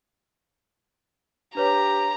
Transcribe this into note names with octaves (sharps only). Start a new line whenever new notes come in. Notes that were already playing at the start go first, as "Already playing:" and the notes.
D4 G4 B4 C#5 A#5